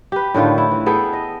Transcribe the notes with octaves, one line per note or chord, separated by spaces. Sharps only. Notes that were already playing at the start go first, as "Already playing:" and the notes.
G4 B4
A2 D3 D#3 F4
E4
E3
B3 G#4 A4 G5
D#5